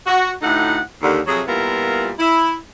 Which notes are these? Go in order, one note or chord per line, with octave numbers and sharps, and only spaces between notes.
F#4
D2 A2 D#4 A4 F#5
D#2 D3
F2 C3 F#3 G#4
A#2 G3 B3 E4 F4 A#4
E4